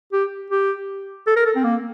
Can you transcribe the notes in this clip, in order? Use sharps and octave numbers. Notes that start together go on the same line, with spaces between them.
G4
G4
A4
A#4
A4
C4
A#3